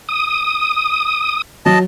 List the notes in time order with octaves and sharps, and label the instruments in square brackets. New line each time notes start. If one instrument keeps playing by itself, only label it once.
[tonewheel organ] D#6
[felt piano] F#3 [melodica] D#5 A5